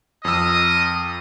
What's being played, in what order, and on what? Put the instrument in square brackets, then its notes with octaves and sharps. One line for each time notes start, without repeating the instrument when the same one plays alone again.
[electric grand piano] F2 E6 [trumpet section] A#4 D#5 D#6